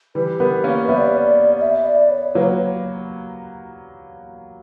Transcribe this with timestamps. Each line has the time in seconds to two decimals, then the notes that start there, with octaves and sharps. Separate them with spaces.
0.15 E3 G3 B4
0.40 G3 B3 A#4
0.64 A#3 C#4 B4
0.88 G3 B3 E5
0.97 D5
1.07 C#5
1.17 D5
1.56 D5
1.62 E5
1.86 D5
2.10 C#5
2.35 F#3 A#3 B4
2.44 C#5